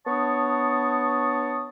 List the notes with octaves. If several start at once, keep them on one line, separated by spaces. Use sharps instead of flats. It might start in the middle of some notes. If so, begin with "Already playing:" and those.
B3 D4 C#5 A5 C#6 D#6